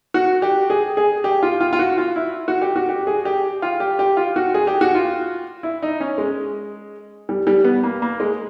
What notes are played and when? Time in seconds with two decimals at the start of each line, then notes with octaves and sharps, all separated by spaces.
0.14 F#4
0.42 G4
0.70 G#4
0.97 G#4
1.24 G4
1.43 F4
1.60 F4
1.73 F4
1.79 F#4
1.98 F4
2.16 E4
2.48 F#4
2.62 G4
2.76 F#4
2.89 G4
3.07 G#4
3.25 G4
3.62 F4
3.80 G4
3.99 G4
4.17 F4
4.36 F#4
4.54 G#4
4.67 G4
4.81 F#4
4.95 F4
5.63 E4
5.83 D#4
6.00 C#4
6.18 G#3
7.29 G3
7.47 G3
7.64 B3
7.83 A#3
8.02 A#3
8.20 G#3